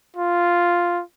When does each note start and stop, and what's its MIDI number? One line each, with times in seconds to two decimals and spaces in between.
0.17 1.02 65